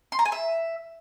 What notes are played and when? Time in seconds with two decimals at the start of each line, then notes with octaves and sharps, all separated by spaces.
0.12 C6
0.19 A#5
0.25 G#5
0.32 E5